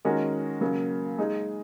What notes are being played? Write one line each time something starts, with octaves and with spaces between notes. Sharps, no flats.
D#3 G#3 C#4 F#4 A#4
C#3 F#3 A#3
G#3 D#4 G#4